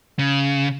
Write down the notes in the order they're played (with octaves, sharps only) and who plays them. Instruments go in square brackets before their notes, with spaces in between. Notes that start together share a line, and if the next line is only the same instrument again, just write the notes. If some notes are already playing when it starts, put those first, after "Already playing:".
[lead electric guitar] C#3